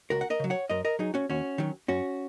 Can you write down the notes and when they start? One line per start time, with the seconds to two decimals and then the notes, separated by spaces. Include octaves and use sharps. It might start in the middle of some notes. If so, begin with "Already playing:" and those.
0.10 C#2 F#4 A#4
0.21 F#5
0.30 A#4 D#5
0.40 C#3 F#3
0.50 C#5 F#5
0.69 F#2 A#4 D#5
0.85 A#4 D#5
0.99 F#3 D#4 G#4
1.14 C#4 F#4
1.30 D#2 C#4 F#4
1.58 D#3 F#3
1.88 F#2 C#4 F#4